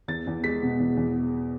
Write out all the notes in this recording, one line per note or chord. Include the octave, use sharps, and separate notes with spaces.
E2 A6
E2
G#3 B6
B2
E2
E2